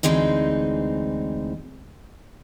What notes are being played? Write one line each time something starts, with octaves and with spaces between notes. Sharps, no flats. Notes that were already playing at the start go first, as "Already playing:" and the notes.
D2 E3 G#3 C4 D#4